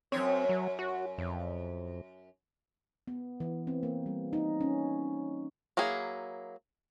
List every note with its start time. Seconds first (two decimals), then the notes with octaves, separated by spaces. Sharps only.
0.12 F#2 D3 C4 C#5
0.49 F#3
0.79 F#4
1.18 F2
3.07 B3
3.40 E3
3.67 C4
3.83 A#3
4.06 G3
4.33 D#4
4.61 C#4
5.77 F#3 A#3 E4 G#4